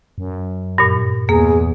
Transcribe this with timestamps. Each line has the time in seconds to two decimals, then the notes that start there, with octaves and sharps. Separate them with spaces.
0.18 F#2
0.78 G2 A#2
1.29 E2 A#3 G#4